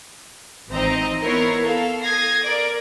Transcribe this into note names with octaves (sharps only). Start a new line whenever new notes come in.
G#1 E3 C4 D#4 D#5 A#5
B3 E4 A#4 C#5 C7
A4 F5
D#6 G#6 A#6 C7
A#4 D5